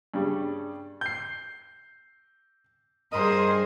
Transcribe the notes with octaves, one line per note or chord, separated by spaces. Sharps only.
G2 C#3 G3
G6 C7
G2 G#4 A#4 C5 D#5